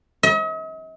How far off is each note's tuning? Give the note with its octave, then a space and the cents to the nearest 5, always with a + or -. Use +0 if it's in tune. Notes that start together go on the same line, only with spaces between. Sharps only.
D#5 +45